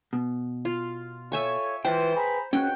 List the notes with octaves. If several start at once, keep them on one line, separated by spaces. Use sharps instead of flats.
B2
F4
F4 A4 C#5 E5 G#5 C#6
E3 F4 B4 C5 G5
G#4 A#5 B5
C#2 C#4 F#4 F#5 G5